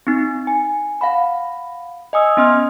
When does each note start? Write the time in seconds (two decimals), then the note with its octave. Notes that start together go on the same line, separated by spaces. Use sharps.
0.07 C4 D#4 A6
0.47 G#5
1.01 F5 F#5 B5
2.13 D#5 G#5 D#6 E6
2.37 B3 C#4 D#5 C6 F6